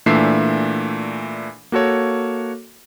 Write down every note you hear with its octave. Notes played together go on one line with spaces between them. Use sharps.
A#2 E3 A3 D4 E5 C7
A#3 F#4 A4 C#5